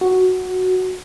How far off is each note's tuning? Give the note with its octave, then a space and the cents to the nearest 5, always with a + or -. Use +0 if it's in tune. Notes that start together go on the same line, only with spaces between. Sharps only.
F#4 +0